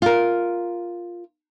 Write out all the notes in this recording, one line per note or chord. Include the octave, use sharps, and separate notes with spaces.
F4 A#4